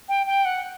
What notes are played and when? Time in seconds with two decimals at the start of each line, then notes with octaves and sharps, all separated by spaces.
0.09 G5
0.27 G5
0.45 F#5